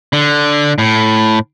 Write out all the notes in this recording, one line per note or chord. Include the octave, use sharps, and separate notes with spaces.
D3
A2